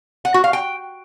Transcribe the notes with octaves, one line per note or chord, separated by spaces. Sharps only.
F#5
F#4
F5
G5